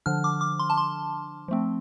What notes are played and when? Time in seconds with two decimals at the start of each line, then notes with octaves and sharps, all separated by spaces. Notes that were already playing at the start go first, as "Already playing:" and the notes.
0.06 D3 F3 D4 F6
0.24 D6
0.41 D6
0.59 C6
0.70 A5
0.77 C6
1.48 F3 A3 C4